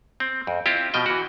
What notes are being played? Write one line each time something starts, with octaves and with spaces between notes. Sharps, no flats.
C4
F2
C4 E4 F4 G4
B2 F3 D#5 G5
E3 F#4